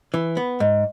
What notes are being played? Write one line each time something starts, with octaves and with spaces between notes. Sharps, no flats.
E3
B3
G#2